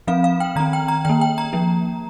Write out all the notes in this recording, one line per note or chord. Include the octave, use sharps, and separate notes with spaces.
F3 C4 F5
F5
G5
D#3 C4 A#5
G5
A#5
D#3 A#3 G5
G5
A#5
F3 A#3